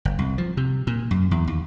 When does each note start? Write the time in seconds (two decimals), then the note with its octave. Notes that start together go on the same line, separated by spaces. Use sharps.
0.05 G1
0.19 C2
0.38 F3
0.57 C3
0.87 A#2
1.11 F#2
1.31 E2
1.48 D#2